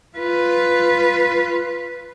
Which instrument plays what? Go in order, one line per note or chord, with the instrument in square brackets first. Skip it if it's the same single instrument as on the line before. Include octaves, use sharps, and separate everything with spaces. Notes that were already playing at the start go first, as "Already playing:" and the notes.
[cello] F4 B4